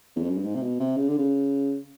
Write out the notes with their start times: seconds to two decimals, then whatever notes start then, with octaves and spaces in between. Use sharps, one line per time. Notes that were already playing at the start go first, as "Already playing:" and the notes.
0.16 E2
0.22 F2
0.30 F#2
0.38 G2
0.44 G#2
0.56 C3
0.63 B2
0.80 C3
0.97 C#3
1.09 D3
1.19 C#3